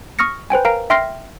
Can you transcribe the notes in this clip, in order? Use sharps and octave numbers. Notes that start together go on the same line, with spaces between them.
C#6 D#6 F6 A#6 C#7
B4 C5 G5 G#5
A#4 F5 A#5 D7
E5 G5 C6 F6 A#6 C7